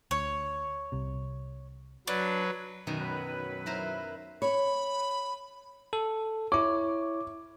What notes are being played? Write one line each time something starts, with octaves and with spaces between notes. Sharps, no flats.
D2 C#5
C2 C3
F#3 D4 B4
F#2 B2 D#3
F#3 B4
E4 A#4 C5
C#5 B5
A4
E4 C#5 D6